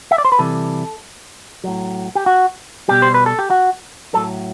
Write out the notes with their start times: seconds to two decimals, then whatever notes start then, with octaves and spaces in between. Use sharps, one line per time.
0.11 E5
0.18 D5
0.25 C5
0.32 B4
0.39 C3 E3 G3 A4
1.64 A2 F#3
2.15 G4
2.26 F#4
2.88 B2 G3 G4
3.02 C5
3.14 B4
3.26 A4
3.39 G4
3.50 F#4
4.13 A2 F#3 A4